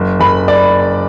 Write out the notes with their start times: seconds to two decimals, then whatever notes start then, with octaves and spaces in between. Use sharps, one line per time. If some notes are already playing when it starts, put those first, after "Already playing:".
Already playing: F#1
0.19 F#1 B5
0.48 D5